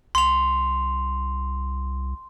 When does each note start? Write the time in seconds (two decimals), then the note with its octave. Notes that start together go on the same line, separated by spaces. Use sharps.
0.15 C2 C6 F7